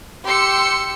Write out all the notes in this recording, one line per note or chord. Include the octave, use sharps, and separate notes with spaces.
G4 C6 E6 C#7